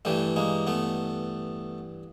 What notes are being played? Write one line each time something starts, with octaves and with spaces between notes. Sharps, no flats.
G2 E3 G3 A3
G#3 A#3
A3 B3